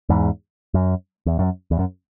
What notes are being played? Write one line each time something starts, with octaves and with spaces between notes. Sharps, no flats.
E2 G#2
F#2
E2
F#2
E2
F#2